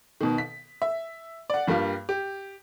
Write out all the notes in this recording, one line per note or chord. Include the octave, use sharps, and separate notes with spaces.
B2 D#3
B6
E5
D5 F#5
G2 G3 A#3 F4
G4